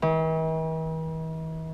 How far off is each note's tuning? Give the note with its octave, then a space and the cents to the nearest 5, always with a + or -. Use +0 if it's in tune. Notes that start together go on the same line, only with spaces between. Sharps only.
E3 -45